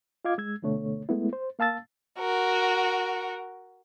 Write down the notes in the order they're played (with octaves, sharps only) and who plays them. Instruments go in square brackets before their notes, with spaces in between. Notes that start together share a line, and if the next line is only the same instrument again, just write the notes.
[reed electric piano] F4 D#5 F5 D6 G#6
G#3 E6 G#6
D2 B2 D3 A3 C#5
G#3 A3 B3 E4
C5
A#3 F5 A5 E6 A6
[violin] F#4 A#4